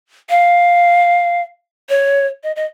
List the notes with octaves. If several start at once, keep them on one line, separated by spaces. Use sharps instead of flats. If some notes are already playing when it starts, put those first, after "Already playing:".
F5
C#5
D#5
D#5